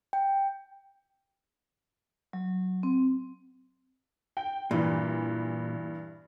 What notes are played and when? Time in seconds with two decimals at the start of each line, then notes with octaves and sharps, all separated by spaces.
0.13 G5
2.33 F#3
2.83 C4
4.37 G5
4.71 G2 A#2 E3